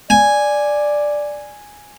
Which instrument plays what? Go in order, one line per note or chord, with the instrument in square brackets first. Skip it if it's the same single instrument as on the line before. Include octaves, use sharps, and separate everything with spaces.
[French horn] D5 [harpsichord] G#5